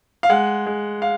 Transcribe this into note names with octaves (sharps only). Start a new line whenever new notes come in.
F5
G#3 F#5
G#3
F5